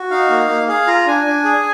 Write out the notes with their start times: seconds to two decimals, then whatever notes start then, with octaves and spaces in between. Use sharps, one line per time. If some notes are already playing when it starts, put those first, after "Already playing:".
Already playing: F#4
0.11 D#4 F5
0.30 A#3
0.49 A#3
0.68 G#4 F5
0.87 F4 A#5
1.06 D4 G#5
1.26 D4
1.45 G#4